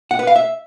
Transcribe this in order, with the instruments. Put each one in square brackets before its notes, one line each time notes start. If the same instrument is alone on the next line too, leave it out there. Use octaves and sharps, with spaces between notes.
[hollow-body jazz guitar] F#5
B4
F5
E5